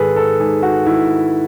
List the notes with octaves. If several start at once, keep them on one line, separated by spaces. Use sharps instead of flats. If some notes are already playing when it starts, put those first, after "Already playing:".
Already playing: G#2 D#3 G#4 A4 B4
A4
G#2 G#4
F#4
D#3 E4